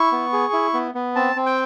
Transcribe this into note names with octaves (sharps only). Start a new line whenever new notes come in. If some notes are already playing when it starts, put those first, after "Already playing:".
Already playing: E4 C#6
B3
G#4
E4
B3
B3
C4 A5
C4
G5